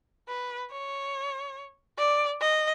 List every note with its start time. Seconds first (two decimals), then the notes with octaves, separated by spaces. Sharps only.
0.29 B4
0.71 C#5
1.98 D5
2.40 D#5